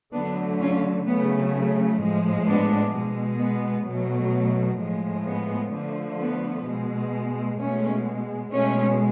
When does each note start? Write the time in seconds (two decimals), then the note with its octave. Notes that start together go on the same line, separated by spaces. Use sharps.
0.13 D3 F#3 A3 B3 D4
0.60 C#4 F4
1.07 C#3 F#3 A3 B3
2.00 A2 F3 G#3
2.47 B3 D4
2.94 B2 G#3
3.40 B3
3.87 B2 F#3 A3
4.80 A2 F3 G#3
5.27 B3
5.73 D3 F3 A3
6.20 B3
6.67 B2 G#3
7.59 B2 G#3 A3 C#4
8.53 B2 G#3 A3 C#4